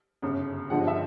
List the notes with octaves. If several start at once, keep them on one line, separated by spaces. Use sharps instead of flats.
G1 F#2 C#3
G1 G2 D3 F3 G#3 F#5
D#5
E5